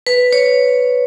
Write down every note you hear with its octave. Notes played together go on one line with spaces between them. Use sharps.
B4
C#5